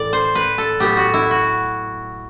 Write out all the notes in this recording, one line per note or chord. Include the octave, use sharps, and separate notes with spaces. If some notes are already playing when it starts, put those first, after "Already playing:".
Already playing: A2 E3 D5
C5
B4
A4
A2 F#3 B3 G4
F#4
E4
F#4